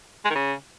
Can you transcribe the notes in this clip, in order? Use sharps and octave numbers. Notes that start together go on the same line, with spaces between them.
G#3
D#3
C#3